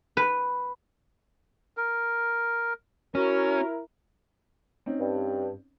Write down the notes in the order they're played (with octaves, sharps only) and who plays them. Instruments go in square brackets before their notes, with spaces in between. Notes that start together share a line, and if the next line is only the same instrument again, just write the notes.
[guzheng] B4
[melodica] A#4
[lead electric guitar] C#4 [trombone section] E4 A#4 [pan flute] F#4
[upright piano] C4 C#4 D#4
[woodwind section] G2